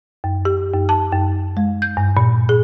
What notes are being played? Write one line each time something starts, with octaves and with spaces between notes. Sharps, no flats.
F#2
G4
F#2
A5
F#2
G#3
G6
G2
A#2
G#4